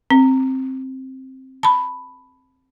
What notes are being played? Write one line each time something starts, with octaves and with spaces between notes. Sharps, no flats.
C4
A5 B5